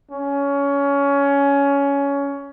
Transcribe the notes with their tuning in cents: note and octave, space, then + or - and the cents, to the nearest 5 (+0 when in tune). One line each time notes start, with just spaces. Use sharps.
C#4 +20